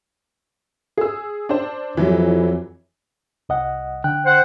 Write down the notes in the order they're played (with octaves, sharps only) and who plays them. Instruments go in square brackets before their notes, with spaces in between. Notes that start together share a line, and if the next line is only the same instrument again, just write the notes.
[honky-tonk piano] G#4 E6
D4 C5
[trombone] F2 [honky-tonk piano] E3 F#3 G3
[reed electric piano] C2 D#5 F#5
D3 G5 F#6
[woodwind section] C5 F#5